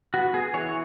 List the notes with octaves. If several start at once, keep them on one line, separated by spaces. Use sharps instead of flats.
B3 F#4
B3 G#4
E3 C#5